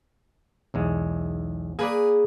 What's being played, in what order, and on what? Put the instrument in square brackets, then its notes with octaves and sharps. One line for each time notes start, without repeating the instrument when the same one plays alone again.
[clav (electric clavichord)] B1 E2 G#3
[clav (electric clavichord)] A#3 B4 D5 [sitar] G#4